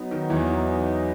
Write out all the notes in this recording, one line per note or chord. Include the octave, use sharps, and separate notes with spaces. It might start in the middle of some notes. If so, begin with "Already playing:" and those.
Already playing: F#3 B3 D#4
D#3
E2 E3